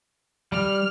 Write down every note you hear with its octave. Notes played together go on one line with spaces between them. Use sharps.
G3 F6